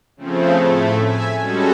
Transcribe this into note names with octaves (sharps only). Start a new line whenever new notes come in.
C#3 F3 A3 C4
A2 A3
E5 G#5
G3 G#3 C#4 F#4 A4